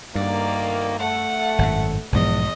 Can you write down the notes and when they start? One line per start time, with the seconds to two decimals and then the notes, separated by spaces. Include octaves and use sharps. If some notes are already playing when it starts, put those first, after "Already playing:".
0.15 D2 G2 D#3 A#3 D5
0.99 A3 F#5
1.58 G#1 F#2 A2
2.12 B1 E2 G#2 F3 D#5